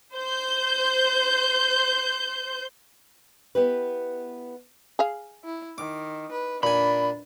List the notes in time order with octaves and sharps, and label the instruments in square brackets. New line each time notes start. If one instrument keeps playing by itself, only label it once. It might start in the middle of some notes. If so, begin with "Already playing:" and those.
[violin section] C5 G6
[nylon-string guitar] B3 E4 G4 B4
[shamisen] G#4 F5
[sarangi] E4
[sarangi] D#3 [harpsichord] D6
[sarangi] B4
[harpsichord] A#2 G#5 [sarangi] D4 [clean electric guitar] B5